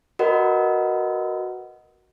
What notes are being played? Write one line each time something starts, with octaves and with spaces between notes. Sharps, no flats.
F#4 A#4 B4 D#5 F#5